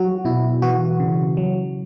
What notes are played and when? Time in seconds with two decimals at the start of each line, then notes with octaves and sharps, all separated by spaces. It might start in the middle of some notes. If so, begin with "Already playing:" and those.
Already playing: F#3 F#4
0.25 B2 E4
0.62 E3 F#4
1.00 C#3
1.37 F#3